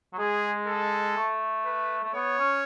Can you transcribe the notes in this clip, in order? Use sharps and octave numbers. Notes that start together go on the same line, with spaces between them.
F#3
G#3 G#4
A4
A3
B4
A3
B3 C#5
C#4